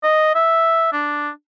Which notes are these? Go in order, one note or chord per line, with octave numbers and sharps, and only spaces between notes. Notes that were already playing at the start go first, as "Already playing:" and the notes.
D#5
E5
D4